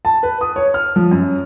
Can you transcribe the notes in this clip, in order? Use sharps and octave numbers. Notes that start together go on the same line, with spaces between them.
A5
B4
D#6
C#5
F6
F3
F#2